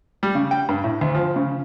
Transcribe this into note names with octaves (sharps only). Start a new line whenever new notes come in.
G3
C#3
G5
G2
A2
D2
F3
C#3